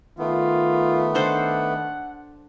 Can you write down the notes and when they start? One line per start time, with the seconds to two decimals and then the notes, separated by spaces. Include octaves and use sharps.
0.19 D#3 A3 B3 F4
1.15 D4 A4 C5 F#5